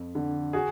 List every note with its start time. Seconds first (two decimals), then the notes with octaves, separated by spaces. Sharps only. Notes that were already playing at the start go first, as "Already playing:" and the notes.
Already playing: F2
0.15 D3
0.53 F#4 G#4